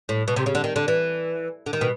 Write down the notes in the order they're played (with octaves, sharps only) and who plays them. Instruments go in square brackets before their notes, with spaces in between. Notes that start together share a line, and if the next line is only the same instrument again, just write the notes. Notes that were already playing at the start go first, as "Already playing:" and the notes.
[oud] A2
B2
C3
C#3
D3
D#3
D3
E3
D3
D#3
B2